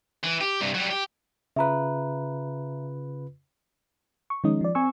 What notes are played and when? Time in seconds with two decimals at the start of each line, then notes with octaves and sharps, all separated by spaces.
0.24 E3
0.41 G4
0.61 G2 C3
0.74 F#3 G3
0.90 G4
1.56 C#3 F4 B4 E5 A#5
4.30 C#6
4.44 D#3 F3 G#3 C#4 D#4 D#5
4.61 F3 D5
4.75 C4 G#5 C#6 E6